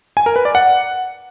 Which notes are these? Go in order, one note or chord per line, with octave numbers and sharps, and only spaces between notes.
G#5
A#4
B4
D5
F#5